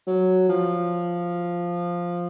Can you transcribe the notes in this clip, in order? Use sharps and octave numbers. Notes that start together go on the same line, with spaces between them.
F#3
F3